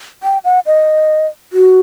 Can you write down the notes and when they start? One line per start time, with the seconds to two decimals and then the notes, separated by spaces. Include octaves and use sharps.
0.23 G5
0.45 F#5
0.66 D#5
1.53 F#4